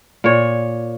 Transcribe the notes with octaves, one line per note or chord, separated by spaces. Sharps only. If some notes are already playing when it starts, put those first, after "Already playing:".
A#2 C#5